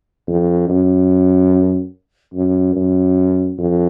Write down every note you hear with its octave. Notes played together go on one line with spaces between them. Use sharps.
F2
F#2
F#2
F#2
F2